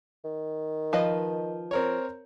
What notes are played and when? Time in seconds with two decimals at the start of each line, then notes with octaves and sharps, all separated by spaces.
0.24 D#3
0.93 F3 B4 D#5
1.71 C4 A#4 C#5